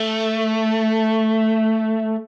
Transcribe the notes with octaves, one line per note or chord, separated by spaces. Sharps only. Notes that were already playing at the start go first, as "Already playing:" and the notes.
Already playing: A3